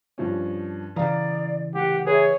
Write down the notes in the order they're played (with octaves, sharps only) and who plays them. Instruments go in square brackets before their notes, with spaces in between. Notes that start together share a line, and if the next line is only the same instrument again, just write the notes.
[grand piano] G2 F3 C#4
[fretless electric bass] C#3 E3 [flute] D5 [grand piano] F5 A#5 D#6
[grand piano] D1 [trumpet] G4 [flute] F#5
[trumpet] G#4 [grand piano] B4 E5 [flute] C#5